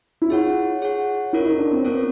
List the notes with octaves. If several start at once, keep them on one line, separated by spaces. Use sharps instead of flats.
E4
F4 G#4 C#5 F#5
G#4 C#5 F#5
C#4 E4 F4 A#4 C#5
D#4
D4
C4
B3 C#4 F4 A#4 C#5